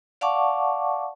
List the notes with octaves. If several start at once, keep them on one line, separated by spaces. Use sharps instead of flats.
D5 F5 F#5 A5 C#6 D6